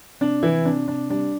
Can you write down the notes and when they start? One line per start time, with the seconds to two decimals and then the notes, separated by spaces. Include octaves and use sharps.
0.21 C3 D4
0.43 C3 E3 E4
0.65 C3 D4
0.88 C3 D4
1.10 G3 D4